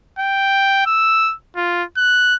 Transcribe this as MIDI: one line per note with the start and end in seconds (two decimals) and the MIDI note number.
0.19 0.85 79
0.86 1.34 88
1.56 1.83 65
1.97 2.35 90